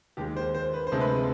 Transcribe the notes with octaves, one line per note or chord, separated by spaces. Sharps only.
D#2 D#3 G#3 G4
C5
C5
B4
C5
D2 C3 F3 G#3
B4